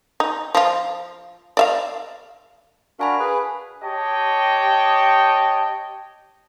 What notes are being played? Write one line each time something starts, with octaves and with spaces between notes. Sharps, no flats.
D#4
F3 F4
D5 E5 F5
D4 F#4 A#4 F5 G#5 B5
G#4 B4
G4 C#5 D#5 G5 A5